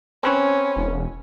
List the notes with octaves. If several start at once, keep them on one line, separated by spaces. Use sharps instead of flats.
C4 C#4 B4 C#5
E1